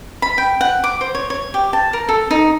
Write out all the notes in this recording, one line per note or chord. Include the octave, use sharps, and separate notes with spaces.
B5
G5
F#5
D6
C5
C#5
C#5
G4
A5
A#4
A4
D#4